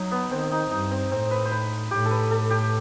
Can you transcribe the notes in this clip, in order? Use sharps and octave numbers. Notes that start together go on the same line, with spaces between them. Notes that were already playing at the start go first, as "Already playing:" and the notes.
Already playing: F#3 D#4
B3
D#3 C4
D#4
G2 D#4
C4
A2 C4
B4
C5
B4
A2 G4
A4
B4
A4
G4